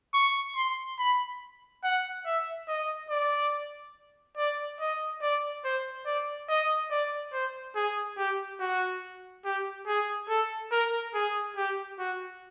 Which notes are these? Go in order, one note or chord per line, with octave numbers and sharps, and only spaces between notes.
C#6
C6
B5
F#5
E5
D#5
D5
D5
D#5
D5
C5
D5
D#5
D5
C5
G#4
G4
F#4
G4
G#4
A4
A#4
G#4
G4
F#4